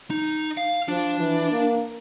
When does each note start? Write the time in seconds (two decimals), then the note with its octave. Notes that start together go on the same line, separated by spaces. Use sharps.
0.10 D#4
0.57 F5
0.88 F3 D4
1.20 E3
1.51 A#3